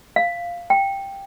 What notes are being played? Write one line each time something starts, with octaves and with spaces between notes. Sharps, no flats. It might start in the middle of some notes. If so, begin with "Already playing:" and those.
F5
G5